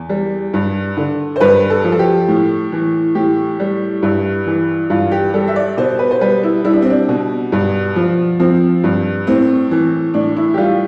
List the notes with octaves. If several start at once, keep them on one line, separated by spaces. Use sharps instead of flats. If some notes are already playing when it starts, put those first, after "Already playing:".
Already playing: E2
G3
G2
D3
C5
G2 B4
A4
F3
A4
G4
A2
E3
A2 G4
G3
G2 E4
E3
G2 F4
G4
G3 A4
E5
D5
B2 C5
B4
C5
G3 B4
E4
G3 E4
D4
C4
D4
B2
G2
F3
F3 C4
G2
A2 C4
E3
A2 D4
E4
G4
G3 F4